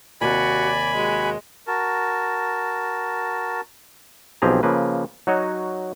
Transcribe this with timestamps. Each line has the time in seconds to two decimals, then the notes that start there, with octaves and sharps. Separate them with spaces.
0.21 D#2 C3 F#4 D5 G#5 B5
0.95 G#3 F#4
1.67 F#4 A#4 A5
4.42 B1 F3 C4 G4 G#4 A#5
4.63 C#3 F3 A#3 B4
5.27 F#3 D#4 F#4 C#5 D#5